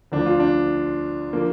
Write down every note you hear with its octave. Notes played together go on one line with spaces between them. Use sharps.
D2 D3 F3 D4
F4
D4
D3 F3 A#3